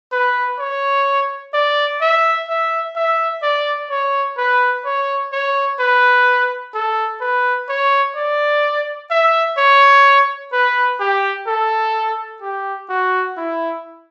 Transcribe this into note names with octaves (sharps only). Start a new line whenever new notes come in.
B4
C#5
D5
E5
E5
E5
D5
C#5
B4
C#5
C#5
B4
A4
B4
C#5
D5
E5
C#5
B4
G4
A4
G4
F#4
E4